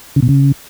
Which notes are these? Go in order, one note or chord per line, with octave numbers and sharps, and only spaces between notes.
C#3
B2
C#3